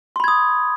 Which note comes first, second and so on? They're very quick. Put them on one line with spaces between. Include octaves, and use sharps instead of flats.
C6 B5 G#6 D#6